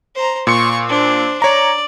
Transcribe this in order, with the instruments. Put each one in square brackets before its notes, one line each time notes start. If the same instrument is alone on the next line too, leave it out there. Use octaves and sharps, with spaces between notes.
[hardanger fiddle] C5 A#5
[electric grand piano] A#2 C6 C#7 [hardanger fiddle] C#6
[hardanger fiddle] D4 C5
[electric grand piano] C#5 A#5 [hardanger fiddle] D5